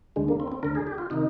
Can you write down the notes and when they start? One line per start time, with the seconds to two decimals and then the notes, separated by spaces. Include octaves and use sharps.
0.16 D2 D3 G#3
0.28 A#3
0.40 C4
0.52 C4
0.63 D2 D3 A#4
0.75 G#4
0.87 G4
0.98 F4
1.10 C3 D#3 D#4